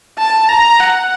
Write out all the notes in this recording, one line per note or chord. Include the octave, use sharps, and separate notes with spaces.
A5
A#5
F#5